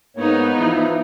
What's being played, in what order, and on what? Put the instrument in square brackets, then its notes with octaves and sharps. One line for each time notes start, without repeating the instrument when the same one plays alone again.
[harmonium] G#2 A#3 C#5 [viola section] B3 D#4
[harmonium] E3 F3 E4